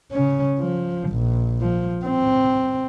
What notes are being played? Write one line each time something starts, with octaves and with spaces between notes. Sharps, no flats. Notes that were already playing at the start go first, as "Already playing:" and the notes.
C#3 C#4
F3
A#1
F3
C4